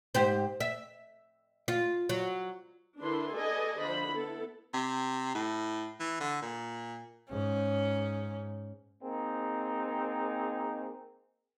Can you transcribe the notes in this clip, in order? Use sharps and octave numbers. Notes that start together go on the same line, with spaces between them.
G#2 G4 C5
E5
F4
F#3
D3 D4 E4 A#4 B4 C6
G#4 A4 B4 D5 D#5 G#5
D3 F3 C5 B5
B3 E4 A4
C3
A2
E3
D3
A#2
G#2 C#4
A#3 C4 D#4 G#4